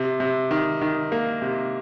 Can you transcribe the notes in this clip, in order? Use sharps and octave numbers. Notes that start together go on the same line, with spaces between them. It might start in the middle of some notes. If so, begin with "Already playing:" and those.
Already playing: C3
C3
D#3
D#3
A#3
C3